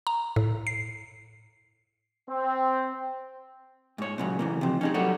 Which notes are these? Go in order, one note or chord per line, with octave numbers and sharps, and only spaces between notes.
A#5
A2
C7
C4
G#2 C#5
A#2 C#3 F#3
C#3 E3 A#3
C3 F3
C#4 D#4 G#4
F#3 G3 A#3 F#4 A4 C#5